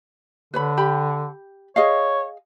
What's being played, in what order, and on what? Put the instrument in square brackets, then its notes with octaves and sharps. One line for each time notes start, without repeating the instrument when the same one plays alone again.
[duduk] D3 [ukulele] B4 C#5 B5
[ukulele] G4 G5 B5
[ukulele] G#4 D#5 F5 [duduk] C#5